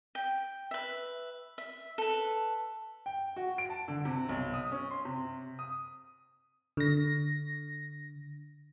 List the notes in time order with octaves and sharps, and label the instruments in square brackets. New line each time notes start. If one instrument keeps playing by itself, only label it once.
[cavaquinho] G5
B4 E5
E5
A4 B4
[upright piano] G5
F#4
D7
A5
D3
C3
B1
D#6
C#4
C6
C3
D#6
[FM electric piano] D3 A#6